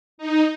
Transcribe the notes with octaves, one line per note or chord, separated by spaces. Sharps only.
D#4